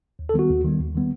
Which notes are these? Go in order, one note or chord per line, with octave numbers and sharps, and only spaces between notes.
D#2
A4
D#3 G3 B3 F#4
D#2
D#3 G3 B3
D#2
D#3 G3 B3